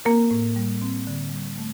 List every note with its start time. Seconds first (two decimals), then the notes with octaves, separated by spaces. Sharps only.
0.05 A#3 C4 A#4
0.31 A2
0.56 G3
0.82 C4
1.07 D3
1.32 G3
1.58 A3